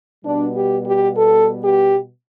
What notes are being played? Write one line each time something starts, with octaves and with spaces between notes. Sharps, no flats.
B2 G3 B3 D4
G4
G4
A4
G4